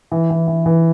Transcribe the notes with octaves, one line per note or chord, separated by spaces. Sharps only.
E3
E3
E3
E3